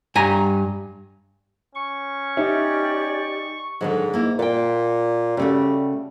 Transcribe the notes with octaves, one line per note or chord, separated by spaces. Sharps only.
G2 G#5 A#5
C#4 C#6
D#4 G4 C#5 D5 E5
G#2 D3 D#3 F#3
A#3 E4
A#2 D5 G5
C#3 G3 A3 F#4